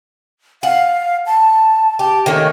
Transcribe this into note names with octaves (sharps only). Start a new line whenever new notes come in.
F5 F#5
A5
G4 A5
D#3 A3 A#3 C#4